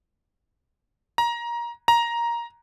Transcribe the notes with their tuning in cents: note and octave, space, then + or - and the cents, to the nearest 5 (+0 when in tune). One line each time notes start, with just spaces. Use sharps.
A#5 +20
A#5 +10